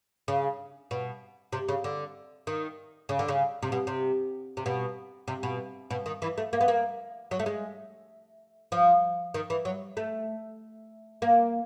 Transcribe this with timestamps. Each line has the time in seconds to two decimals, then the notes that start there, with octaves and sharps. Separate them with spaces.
0.28 C#3
0.91 B2
1.52 C3
1.68 C#3
1.84 D3
2.47 D#3
3.09 C#3
3.19 D3
3.28 C#3
3.63 C3
3.72 B2
3.87 C3
4.57 C3
4.66 B2
5.28 C3
5.43 B2
5.90 B2
6.06 D#3
6.22 E3
6.38 A3
6.53 A#3
6.61 B3
6.68 A#3
7.31 F#3
7.39 A3
7.46 G#3
8.72 F3
9.34 D#3
9.50 E3
9.65 F#3
9.97 A3
11.22 A#3